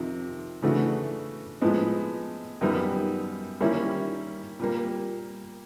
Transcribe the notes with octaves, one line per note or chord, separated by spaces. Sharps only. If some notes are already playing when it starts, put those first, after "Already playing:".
Already playing: F2 C3 D#3
C#3 E3 A3 D4 F#4
A2 F3 G#3 B3
F#2 D#3 G3 B3 D#4
D#3 G3 A#3 C#4 E4
A#2 G3 A#3